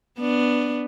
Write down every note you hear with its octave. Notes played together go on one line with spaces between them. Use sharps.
B3 D4